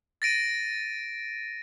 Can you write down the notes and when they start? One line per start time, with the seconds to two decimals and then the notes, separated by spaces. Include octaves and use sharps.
0.22 A6 A#6 D7 D#7